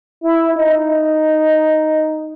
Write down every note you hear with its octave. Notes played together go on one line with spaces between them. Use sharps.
E4
D#4